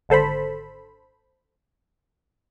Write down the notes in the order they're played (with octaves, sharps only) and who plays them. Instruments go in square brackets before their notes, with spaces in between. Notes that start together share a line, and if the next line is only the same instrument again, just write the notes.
[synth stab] G#1 D3 A4 C5 B5